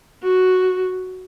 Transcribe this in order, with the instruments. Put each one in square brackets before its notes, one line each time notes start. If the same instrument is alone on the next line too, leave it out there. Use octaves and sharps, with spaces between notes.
[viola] F#4